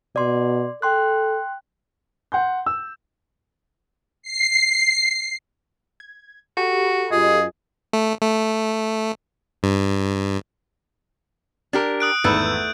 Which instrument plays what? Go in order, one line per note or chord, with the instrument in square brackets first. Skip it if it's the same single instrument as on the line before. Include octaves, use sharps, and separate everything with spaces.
[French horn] B2 [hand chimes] D5 C6
[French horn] A4 [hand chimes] G5 C6 F#6
[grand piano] F#5 C6 G6
E6
[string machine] C7
[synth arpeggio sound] G#6
[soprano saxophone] F#4 [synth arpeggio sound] G4 A4 B5
[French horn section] F#2 F4 D#5 [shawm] G#4
[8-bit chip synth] A3
A3
G2
[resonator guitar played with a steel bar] D4 G4 A#4
[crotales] D#6 F#6 D7
[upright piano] G#1 E2 E6 [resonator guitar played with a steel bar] A3 B4 [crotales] G6